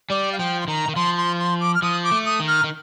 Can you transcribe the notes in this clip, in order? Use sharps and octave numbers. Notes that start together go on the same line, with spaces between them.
G3 D5
F5
F3 G5
C6
D#3 A#5
D#3
F3 C6
C6
C6
D6
F6
F3 D#6
D6
A3
D#6
D#3
F6
D#3